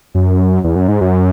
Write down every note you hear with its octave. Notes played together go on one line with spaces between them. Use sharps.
F#2
E2
F#2
G#2
F#2